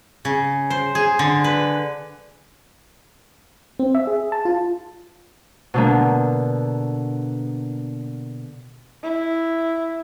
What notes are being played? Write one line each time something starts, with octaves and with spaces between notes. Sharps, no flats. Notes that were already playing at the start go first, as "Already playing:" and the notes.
C#3
C5
G#4
D3
B4
C4
E5
G#4
A5
F4
B2 D3 A#3
E4